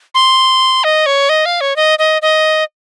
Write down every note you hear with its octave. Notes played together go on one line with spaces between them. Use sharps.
C6
D#5
C#5
D#5
F5
C#5
D#5
D#5
D#5